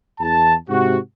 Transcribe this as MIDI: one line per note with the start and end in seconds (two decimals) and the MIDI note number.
0.20 0.55 40
0.20 0.55 81
0.69 0.98 44
0.69 0.98 48
0.69 0.98 66